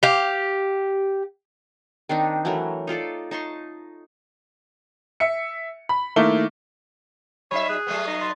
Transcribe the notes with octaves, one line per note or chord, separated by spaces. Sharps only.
G4 F5
D#3 C4 D4 D#4
E3 F#3 A3 A#4
D#4 F4 A4 D5
D#4 A5 C6 C#6
E5 C#7
B5
D#3 A3 A#3 E4 G7
F#3 D#4 C#5 E5 B5
G#4 F#6
F#3 A3 B3
D#4
C6 A6